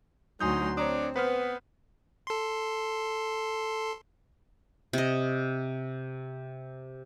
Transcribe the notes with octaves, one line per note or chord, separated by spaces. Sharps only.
D2 F#3 D#4 G#5 C6 D#6 G6
C4 D4 C#5 A#5 D#6
B3 B4 C5 F6
A4 C6
C3 D#5